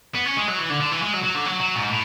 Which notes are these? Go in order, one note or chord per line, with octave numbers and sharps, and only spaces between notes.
B3
C#4
G#3
F#3
E3
D3
D3
E3
G#3
F#3
F#3
D3
F#3
F#3
G#2
A2